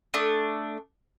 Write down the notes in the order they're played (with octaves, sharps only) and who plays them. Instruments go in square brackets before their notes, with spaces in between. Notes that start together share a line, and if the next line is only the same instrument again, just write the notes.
[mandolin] A3 D4 D6 D#6